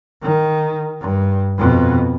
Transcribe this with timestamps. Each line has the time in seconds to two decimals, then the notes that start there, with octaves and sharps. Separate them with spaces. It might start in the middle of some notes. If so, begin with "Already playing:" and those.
0.22 D#3
1.00 G2
1.58 F2 B2